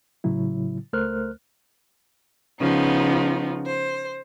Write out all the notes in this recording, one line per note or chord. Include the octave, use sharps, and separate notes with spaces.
A2 C#3 F#3 E4
C#2 A3 A#4 C5 F6 F#6
C#3 F3 B3 D#4
C5